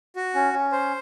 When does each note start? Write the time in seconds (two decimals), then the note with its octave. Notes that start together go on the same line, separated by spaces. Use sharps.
0.16 F#4
0.35 C#4
0.53 C#4
0.72 C5